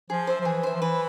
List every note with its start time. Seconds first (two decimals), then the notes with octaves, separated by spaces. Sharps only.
0.10 F3 G#4
0.27 C5 E5
0.41 F3
0.45 E3 G#4
0.63 C5 E5
0.75 F3
0.81 E3 B4